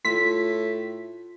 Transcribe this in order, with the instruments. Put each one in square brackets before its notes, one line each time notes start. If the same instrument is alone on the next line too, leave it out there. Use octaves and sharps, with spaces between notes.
[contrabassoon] A2 [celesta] F4 C6 [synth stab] B6